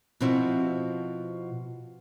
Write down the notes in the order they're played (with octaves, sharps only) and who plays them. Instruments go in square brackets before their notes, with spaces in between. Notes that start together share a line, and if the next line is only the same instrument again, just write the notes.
[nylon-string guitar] B2 F3 C4 E4 F#4